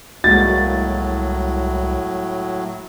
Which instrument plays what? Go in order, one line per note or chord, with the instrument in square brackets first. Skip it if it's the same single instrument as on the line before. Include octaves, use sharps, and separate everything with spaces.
[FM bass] C2 [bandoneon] A2 F#3 [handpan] G#3 A#3 F#4 [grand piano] A6